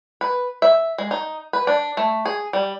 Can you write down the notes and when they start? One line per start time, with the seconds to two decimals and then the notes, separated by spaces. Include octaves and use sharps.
0.21 B4
0.62 E5
0.98 G#3
1.11 D#4
1.53 B4
1.67 D4
1.97 A3
2.25 G#4
2.53 G3